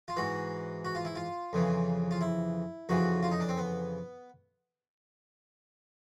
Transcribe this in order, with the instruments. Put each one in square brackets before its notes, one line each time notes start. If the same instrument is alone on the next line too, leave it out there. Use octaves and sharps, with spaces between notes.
[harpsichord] F4
G#2 E3 F#4
F#4
F4
E4
F4
F2 C#3 E3
F4
E4
F2 C#3 E3 F#4
F4
D#4
D4
C4
B3